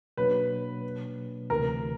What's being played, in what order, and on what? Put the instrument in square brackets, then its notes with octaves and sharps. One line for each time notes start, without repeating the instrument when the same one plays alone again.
[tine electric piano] B2 F#3 A#3 D4 [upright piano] B4
[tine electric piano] D2 C3 E3 [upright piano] A#4